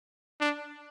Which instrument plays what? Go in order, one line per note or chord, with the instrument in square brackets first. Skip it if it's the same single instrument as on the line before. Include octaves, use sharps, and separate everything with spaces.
[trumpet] D4